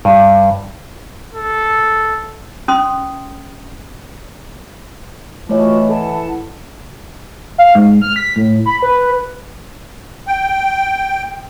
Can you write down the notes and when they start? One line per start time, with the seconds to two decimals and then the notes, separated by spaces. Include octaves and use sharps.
0.05 G2
1.34 A4
2.68 C#4 C6 D#6
5.49 E3 A3 F4 F#4 C#5 D#5 A5
5.89 E4 A4 F#5 A5
7.58 F5
7.75 G#2
8.02 F6
8.16 B6
8.36 A2
8.66 B5
8.82 B4
10.27 G5